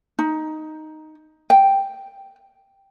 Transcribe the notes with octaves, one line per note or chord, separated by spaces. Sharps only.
D#4
G5